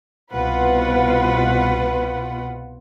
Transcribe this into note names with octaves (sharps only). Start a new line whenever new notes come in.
C2 B2 F4 B4 F#5